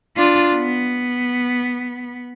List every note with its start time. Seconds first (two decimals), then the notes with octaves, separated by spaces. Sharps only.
0.17 D4 F4
0.55 B3